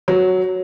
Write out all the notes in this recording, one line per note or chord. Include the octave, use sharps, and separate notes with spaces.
F#3